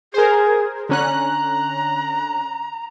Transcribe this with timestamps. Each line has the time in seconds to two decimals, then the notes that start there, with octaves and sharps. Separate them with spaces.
0.14 G#4 A#4 C5
0.89 D3 C#4 A#5 F#6